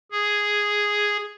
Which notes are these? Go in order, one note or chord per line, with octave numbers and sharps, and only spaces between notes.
G#4